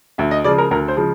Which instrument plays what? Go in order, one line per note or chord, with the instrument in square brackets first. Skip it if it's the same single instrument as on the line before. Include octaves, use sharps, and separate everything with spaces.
[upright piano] D2 E5
D#5
C#3 F3 G#3 D5
A#4
D2 A#4
C5
C#3 F3 G#3